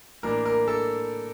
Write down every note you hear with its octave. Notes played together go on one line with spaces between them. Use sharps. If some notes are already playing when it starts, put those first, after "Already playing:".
A2 E3 A#3 D4 A#4
A#4
A4